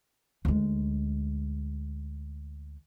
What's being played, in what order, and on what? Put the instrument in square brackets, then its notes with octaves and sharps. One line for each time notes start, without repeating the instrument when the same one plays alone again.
[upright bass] D2 G#3